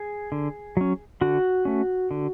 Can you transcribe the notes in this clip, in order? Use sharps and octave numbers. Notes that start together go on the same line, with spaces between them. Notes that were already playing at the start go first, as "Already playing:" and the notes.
Already playing: G#4
D3
F#3 C#4
D3 F#4
A3 C#4
D3